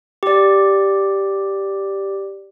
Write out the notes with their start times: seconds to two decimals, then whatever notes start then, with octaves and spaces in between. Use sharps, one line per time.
0.23 G4 D5